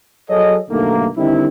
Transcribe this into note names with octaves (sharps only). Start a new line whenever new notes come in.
F#3 G#4 A4 C#5 D#5
B1 G2 D3 D#3 A3 A#3
D3 D#3 G3 C4 D#4 E4